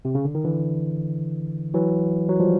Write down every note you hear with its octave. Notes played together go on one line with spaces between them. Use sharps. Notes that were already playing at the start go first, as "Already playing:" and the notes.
C3
C#3
D3
D#3
D3 E3
E3 F#3
F#3
F3 G3